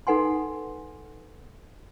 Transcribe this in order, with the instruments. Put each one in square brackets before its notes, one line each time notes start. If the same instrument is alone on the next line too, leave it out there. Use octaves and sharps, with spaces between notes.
[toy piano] D#4 A4 B4 F#5 G#5 C6